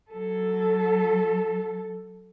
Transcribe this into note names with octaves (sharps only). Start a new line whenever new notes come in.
F#3 A4